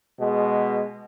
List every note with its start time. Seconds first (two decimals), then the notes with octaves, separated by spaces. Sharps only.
0.19 B2 G#3